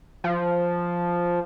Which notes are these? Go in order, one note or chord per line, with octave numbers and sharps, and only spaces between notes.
F3